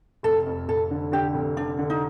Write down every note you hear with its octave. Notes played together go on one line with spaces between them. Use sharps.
F1 A4
F2
F1 A4
D3
D3 G4
F1
D3 D4
D3
D#4